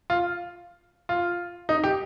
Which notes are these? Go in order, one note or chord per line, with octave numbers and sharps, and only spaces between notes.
F4
F4
D#4
G4